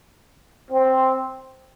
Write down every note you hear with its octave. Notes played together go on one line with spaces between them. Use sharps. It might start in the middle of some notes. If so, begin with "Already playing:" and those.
C4